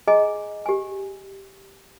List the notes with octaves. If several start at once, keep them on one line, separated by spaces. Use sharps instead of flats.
G#4 D#5 G#5 A#5
G4 G#5